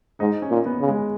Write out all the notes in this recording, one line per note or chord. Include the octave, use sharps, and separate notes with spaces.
G#2 D#4
C#4
A#2
B3
C#3
G#3